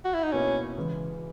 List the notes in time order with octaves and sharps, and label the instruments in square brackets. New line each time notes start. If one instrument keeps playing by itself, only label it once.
[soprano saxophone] F#4
E4
D#4
[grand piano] B2 A#3 E4 [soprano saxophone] C#4
[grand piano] C#3 E3 G#3